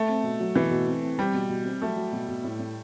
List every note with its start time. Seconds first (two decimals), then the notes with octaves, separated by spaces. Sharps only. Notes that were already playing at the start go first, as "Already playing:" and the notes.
Already playing: A3
0.09 C4
0.24 B2
0.40 F#3
0.55 B2 E3
0.71 B2
0.87 C4
1.02 C4
1.18 G3 C4
1.34 B2
1.49 B2
1.65 C4
1.82 F#3 A3
1.96 F#3
2.12 B2
2.28 B2
2.44 A2
2.59 A2